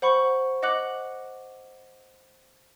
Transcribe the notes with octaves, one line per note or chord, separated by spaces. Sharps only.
C5 F#5 B5 C#6
D#5 F#5 D6 F#6 F#7